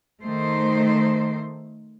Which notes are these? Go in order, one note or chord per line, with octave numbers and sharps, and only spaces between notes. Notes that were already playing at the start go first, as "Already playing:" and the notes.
D#3 A3 C5